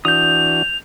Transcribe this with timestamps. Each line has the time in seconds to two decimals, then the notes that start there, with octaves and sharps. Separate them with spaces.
0.05 E3 D4 F#4 D#6 G6 F7